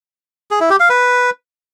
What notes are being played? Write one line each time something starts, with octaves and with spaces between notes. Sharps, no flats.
G#4
E4
G4
F5
B4